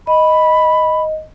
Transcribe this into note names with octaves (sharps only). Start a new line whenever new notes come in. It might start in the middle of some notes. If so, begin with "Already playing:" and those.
D#5 B5